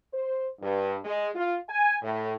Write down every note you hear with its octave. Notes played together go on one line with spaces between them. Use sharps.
C5
G2
G#3
F4
G#5
A2